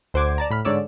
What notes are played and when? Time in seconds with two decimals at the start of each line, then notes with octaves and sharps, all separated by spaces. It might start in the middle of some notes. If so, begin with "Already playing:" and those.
0.14 D2 C5 F#5 D6 G#6
0.38 D5 A5 A#5
0.50 A2 B5 F6
0.65 G#2 D3 C#5 D5 E6